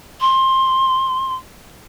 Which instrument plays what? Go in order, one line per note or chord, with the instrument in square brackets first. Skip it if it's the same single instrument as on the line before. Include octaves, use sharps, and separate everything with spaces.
[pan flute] C6